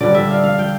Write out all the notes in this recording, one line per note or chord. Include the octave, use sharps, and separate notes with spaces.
D3 G3 D4 D5
E5
F5
F5
G5